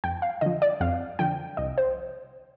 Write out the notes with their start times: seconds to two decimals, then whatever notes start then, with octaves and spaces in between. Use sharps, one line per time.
0.04 F2 G5
0.22 F5
0.41 D3 F3 D#5
0.62 D5
0.81 F2 F5
1.19 D3 F3 G5
1.57 C2 D#5
1.78 C5